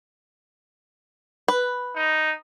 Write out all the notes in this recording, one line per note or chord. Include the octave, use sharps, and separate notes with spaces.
B4
D#4